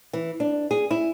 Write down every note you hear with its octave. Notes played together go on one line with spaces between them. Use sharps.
E3
D4
G#4
E4